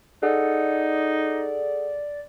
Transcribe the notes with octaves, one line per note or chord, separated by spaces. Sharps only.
D#4 G#4 A4 D5 F#5